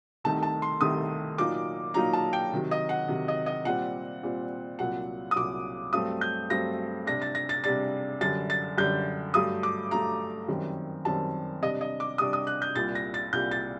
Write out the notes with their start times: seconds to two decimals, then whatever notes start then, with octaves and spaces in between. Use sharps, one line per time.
0.24 C2 C3 D#3 A3 D#4 A5
0.43 A5
0.62 C6
0.81 C2 C3 D#3 A3 D#4 D#6
1.38 A#2 F#3 A#3 D#4 D6
1.94 A#2 F#3 A#3 D#4 A#5
2.13 A5
2.33 G5
2.52 C3 D#3 F#3
2.71 D#5
2.89 F#5
3.08 C3 D#3 F#3
3.28 D#5
3.46 D#5
3.65 A#2 G3 C4 F#5
4.23 A#2 G3 C4
4.79 C2 A#2 F#3 F#5
5.31 D#6
5.36 C2 A#2 F#3 D6
5.93 G2 F#3 A3 C4 D#6
6.21 G6
6.50 G2 F#3 A3 C4 A#6
7.06 C3 G3 D4 A#6
7.22 A6
7.35 A#6
7.49 A6
7.64 C3 G3 D4 A6
8.21 F#2 D3 G3 A6
8.50 A6
8.78 F#2 D3 G3 G6
9.34 G2 F#3 A3 D#6
9.63 D6
9.91 G2 F#3 A3 A#5
10.48 F#2 D#3 G3 C4
11.05 F#2 D#3 G3 C4 A5
11.62 C3 G3 D4 D#5
11.81 D#5
12.00 D6
12.18 C3 G3 D4 D#6
12.33 D#6
12.47 F#6
12.62 G6
12.75 C2 A#2 G3 A6
12.95 A#6
13.14 A6
13.33 C2 A#2 G3 G6
13.51 A6